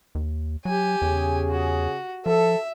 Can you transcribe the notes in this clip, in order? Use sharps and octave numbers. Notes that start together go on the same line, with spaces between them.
D#2
F#3 G4 G#5
E2 C#3 C#4 G#4
F#4
F3 A4 E5